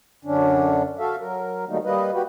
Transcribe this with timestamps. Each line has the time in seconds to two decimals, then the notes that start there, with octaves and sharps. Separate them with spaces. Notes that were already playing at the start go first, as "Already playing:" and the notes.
0.25 F#2 D3 C#4 D4
0.99 F#4 A4 E5 F5
1.20 F#3 A#4
1.68 D#3 F#3 G3 A3 A#3 D#4
1.84 G3 A#3 B4 D#5
2.13 F#4 G4 B4